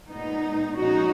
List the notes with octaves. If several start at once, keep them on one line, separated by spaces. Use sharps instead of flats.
A#2 G#3 B3 D#4
A#2 F3 G#3 C#4 D#4 F#4